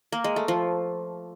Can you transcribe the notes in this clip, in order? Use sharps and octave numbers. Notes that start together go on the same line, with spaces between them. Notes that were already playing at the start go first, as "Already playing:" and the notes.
A#3
G#3
A3
F3